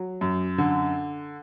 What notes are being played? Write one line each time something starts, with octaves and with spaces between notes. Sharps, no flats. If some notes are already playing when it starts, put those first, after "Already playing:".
Already playing: F#3
F#2
D3